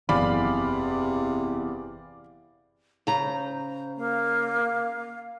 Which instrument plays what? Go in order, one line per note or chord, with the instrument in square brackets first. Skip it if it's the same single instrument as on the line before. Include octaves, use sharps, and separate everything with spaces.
[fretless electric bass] F#1 [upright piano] E2 [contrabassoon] C3 [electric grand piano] D5 F5 B5
[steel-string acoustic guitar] C#3 A#5 [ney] C5
[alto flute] A#3 [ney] F5